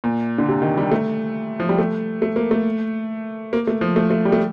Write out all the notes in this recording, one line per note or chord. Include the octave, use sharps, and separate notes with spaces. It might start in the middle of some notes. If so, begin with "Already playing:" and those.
A#2
D3
C3
D#3
G3
A3
F3
G3
A3
A3
A#3
A3
A#3
A3
F3
A3
A3
G3
A3